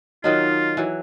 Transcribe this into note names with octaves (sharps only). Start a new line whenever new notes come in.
D#3 F#3 D#4 F4
E3 F#3